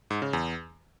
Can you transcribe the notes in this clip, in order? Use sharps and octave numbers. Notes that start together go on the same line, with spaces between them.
G#2
C#3
E2